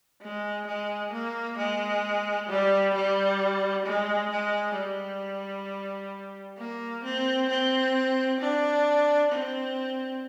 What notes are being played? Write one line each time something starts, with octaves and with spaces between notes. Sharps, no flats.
G#3
G#3
A#3
G#3
G3
G3
G#3
G#3
G3
A#3
C4
C4
D4
C4